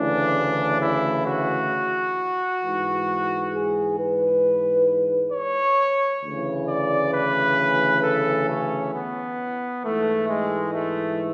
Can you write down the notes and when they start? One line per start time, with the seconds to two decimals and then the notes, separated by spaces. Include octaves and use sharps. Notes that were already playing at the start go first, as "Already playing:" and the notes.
Already playing: D2 C#3 E3 D4
0.81 E4
1.26 F#4
2.62 G#2 E3
3.52 G#4
3.97 B4
5.32 C#5
6.23 D2 C#3 E3
6.68 D5
7.12 B4
8.03 A4
8.48 C#4
8.93 B3
9.83 G#2 E3 A3
10.29 G#3
10.74 A3